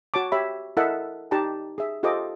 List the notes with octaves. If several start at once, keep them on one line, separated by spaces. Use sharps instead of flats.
F#4 C#5 A5 D6
G4 C#5 E5 B5
E4 A4 A#4 D#5 E5 F#5
D#4 G4 D5 A5 A#5
G#4 E5
F4 G4 A4 C5 D#5 D6